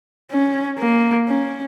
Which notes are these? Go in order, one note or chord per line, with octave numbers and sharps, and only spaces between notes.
C#4
A#3
C#4